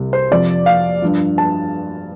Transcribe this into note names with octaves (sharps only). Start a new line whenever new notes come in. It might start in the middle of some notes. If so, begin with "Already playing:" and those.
Already playing: C2 C3 G3
C5
F2 C3 F3 D5
F5
G2 F3
A5